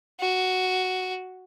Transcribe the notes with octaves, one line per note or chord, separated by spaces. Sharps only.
F#4